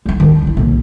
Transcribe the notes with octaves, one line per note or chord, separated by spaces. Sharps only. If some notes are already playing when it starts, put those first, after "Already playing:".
G#3 D#4
D#3 D4
C#2 E4
B1 A#2